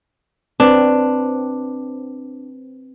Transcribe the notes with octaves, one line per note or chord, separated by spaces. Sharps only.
C4 D4 B4